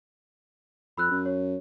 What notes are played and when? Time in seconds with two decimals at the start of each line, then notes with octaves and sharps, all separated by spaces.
0.97 F2 B5 E6 F#6
1.11 F#2
1.26 C#5